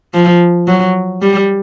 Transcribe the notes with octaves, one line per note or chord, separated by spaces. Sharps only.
F3
F#3
G3